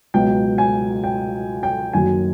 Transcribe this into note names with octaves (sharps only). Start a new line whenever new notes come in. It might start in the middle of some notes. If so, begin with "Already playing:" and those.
C#2 B2 F#3 B3 G5
G#5
G5
G5
F#1 F#2 D#3 F#3 G#5